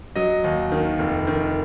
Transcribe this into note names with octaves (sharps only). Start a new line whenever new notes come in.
F#3 D#5
D#2
D#3
F1
D#3